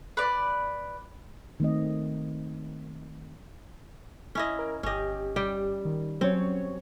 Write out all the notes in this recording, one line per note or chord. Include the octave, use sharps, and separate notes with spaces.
B4 D5
D#3 A3 C4 D#5
C#4 E4 D#5
A#4
G1 C#4 G4 D#5
G3 G5
D#3
F#3 C4 C#4 C#5